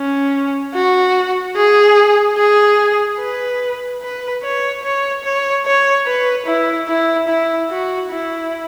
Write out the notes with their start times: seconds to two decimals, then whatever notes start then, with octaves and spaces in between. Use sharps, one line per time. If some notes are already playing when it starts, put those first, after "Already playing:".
Already playing: C#4
0.74 F#4
1.56 G#4
2.37 G#4
3.19 B4
4.02 B4
4.43 C#5
4.83 C#5
5.24 C#5
5.66 C#5
6.06 B4
6.47 E4
6.88 E4
7.28 E4
7.70 F#4
8.10 E4